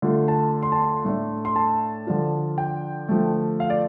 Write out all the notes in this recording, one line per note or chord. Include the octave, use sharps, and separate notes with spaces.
D3 A3 F4
A5
C6
A5
C6
A2 A3 D4
C6
A5
D3 F3 D4 F4
G5
D3 F3 A3
F5
D5